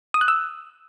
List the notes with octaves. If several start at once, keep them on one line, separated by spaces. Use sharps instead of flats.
D#6
F#6
E6